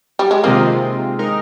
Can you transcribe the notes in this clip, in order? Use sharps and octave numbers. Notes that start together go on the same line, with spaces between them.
G3
G#3
C3 D#3 G#3 A#3 C4 F4
G#3 D#4 A#4